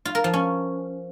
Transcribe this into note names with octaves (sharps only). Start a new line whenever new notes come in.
F4
A#4
F3
C#4